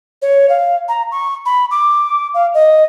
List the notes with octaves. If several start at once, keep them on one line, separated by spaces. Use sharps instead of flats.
C#5
F5
A#5
C#6
B5
D6
F5
D#5